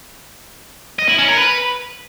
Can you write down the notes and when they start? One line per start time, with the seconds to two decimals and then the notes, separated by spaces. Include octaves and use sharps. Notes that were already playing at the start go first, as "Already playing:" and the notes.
0.99 D#5
1.09 E4
1.19 C#4
1.28 A#4
1.38 B4